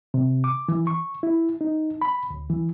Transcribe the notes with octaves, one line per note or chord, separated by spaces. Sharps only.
C3
D6
E3
C#6
E4
D#4
B5
D2
E3